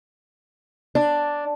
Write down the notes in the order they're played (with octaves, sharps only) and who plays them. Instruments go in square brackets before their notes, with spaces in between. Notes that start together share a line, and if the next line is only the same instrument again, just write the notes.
[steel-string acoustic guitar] D4